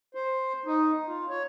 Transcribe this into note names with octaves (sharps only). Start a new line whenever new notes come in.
C5
D#4
F4
C#5